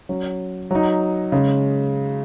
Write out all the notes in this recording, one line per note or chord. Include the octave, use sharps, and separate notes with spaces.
F#3 C#4
F#3 D#4
C#3 G#3